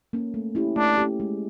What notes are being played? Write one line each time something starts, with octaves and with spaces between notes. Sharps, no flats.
A#3 C#4
A3
C#4 E4 G4
A3 D4
C#4 E4 G4
G#3